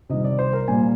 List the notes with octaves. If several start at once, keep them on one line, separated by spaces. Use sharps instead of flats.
C3 D#3 G3 D#5
D5
C5
A#4
A#2 G3 A#3 G#5